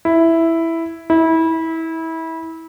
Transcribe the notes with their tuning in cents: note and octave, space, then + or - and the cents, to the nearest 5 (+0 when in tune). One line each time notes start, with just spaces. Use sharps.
E4 +0
E4 -25